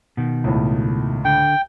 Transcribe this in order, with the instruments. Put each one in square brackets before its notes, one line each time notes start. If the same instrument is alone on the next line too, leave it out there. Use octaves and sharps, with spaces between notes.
[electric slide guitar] B2 D#3
[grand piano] C#2 A2
[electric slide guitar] D3 [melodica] G5